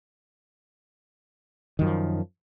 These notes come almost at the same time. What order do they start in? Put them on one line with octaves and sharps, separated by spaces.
D#3 F#2 F3